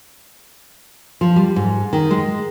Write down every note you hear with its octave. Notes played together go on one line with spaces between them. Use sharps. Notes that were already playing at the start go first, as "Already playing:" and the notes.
F3
G3
G#2
D#3
G#3